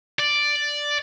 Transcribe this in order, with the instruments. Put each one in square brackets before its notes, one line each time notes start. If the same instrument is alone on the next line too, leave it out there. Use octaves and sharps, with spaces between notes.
[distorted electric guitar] D5